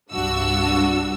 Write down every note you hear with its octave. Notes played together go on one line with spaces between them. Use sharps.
C2 G2 D4 F#4 E6